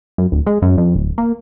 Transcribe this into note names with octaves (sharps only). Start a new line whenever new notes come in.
F#2
D1
G#3
F#2
F2
D1
A#3